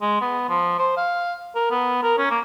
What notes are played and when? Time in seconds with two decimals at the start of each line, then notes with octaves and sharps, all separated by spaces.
0.02 G#3
0.22 B3
0.49 F3
0.79 C5
0.97 F5
1.56 A#4
1.71 B3
2.03 A#4
2.18 C#4
2.31 A#3